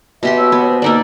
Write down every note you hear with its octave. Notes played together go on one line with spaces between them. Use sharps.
B2 G4 E5 C6
F#4 C#5 E6
B3
C5
A#3 D#4 B4 D5 E6